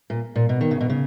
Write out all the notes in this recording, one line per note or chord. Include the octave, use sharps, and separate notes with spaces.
A#2
A#2
B2
D#3
C#3
B2
C#3